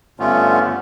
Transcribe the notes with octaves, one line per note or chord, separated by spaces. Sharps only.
G2 D3 A3 B3 C#4 F4